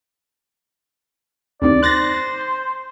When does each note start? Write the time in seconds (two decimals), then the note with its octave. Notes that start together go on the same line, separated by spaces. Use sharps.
1.62 D2 C3 D#3 D5
1.83 C5 F#6 A6 A#6